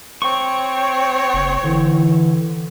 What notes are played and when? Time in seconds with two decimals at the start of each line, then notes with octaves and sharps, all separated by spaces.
0.22 C4 C#5 C#6
1.34 F#1
1.64 D3 E3